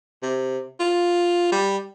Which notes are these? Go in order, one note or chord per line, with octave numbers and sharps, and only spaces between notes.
C3
F4
G3